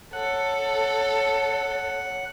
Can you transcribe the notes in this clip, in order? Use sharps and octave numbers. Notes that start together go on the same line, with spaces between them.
A4 C#5 F#5